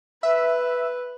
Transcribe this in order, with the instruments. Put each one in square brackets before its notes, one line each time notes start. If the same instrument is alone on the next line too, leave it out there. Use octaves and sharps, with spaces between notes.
[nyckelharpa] B4 [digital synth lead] E5